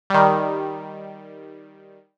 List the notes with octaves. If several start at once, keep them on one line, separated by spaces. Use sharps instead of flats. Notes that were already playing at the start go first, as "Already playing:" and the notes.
D#3 G3